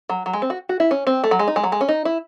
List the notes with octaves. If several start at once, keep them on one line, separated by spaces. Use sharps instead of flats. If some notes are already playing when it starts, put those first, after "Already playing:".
F#3
F#3
G#3
C4
F#4
F#4
E4
C#4
C4
A3
F#3
G#3
D#4
G#3
F#3
G#3
C#4
D#4
E4